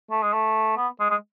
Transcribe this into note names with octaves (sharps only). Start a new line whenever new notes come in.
A3
G#3
A3
B3
G#3
G#3